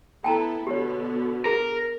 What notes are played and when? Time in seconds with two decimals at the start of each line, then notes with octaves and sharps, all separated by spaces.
0.24 B3 E4 A4 G5 A5 A#5
0.67 B2 D3 B3 G4 C#5
1.46 G#4 A#4